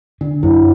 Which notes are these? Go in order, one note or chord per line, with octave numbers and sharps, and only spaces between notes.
D3 D4
F#2 E4